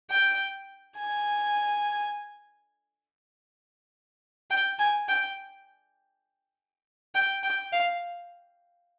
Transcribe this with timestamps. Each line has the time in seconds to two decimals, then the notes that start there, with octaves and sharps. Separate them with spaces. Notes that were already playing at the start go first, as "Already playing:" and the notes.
0.11 G5
0.99 G#5
4.50 G5
4.79 G#5
5.09 G5
7.15 G5
7.43 G5
7.73 F5